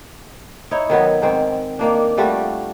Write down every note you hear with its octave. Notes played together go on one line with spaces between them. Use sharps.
D#4 E4 C#5
D#3 F#3 B3
G#2 D#3 C4
D#3 A#3 D4
G3 A3 F4 F#4